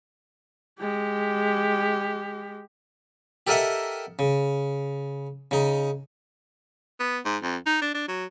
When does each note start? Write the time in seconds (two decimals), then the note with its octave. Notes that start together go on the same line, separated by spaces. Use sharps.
0.80 G#3 G4
3.47 G4 A4 A#4 D#5 E5 F#5
4.19 C#3
5.51 C#3 D#4
7.00 B3
7.25 G#2
7.42 F2
7.66 D#4
7.82 D4
7.95 D4
8.08 F#3